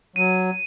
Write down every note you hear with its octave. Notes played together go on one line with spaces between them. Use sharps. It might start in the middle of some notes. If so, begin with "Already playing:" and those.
F#3 D#7